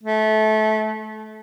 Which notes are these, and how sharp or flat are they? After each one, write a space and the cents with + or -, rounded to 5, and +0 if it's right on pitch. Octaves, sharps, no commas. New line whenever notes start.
A3 -25